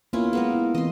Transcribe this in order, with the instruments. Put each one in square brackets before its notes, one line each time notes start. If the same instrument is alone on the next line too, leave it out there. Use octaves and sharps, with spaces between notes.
[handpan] A#3 B3 [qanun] C#4 E4 F4
[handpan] G#3 G#4 [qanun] A#3 B3 A#4
[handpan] E4
[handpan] E3 C4 [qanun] D#5 C6